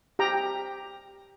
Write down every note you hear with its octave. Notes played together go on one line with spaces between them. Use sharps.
G4 G5 A#5